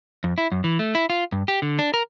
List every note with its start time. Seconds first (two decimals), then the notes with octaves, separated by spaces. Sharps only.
0.24 F2
0.38 E4
0.52 F#2
0.64 E3
0.79 A3
0.95 E4
1.10 F4
1.32 G2
1.48 G4
1.62 D3
1.79 D4
1.94 A#4